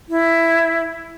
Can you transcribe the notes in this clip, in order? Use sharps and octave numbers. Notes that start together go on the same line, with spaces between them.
E4